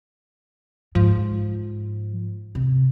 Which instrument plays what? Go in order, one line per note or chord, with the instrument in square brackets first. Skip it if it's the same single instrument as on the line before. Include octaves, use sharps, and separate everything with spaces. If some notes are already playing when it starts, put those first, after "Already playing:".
[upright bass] G#2 [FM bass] F3
[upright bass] C3